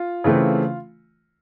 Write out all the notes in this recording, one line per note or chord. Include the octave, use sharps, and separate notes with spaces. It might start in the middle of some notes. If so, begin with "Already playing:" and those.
Already playing: F4
C#3 E3 A3 C4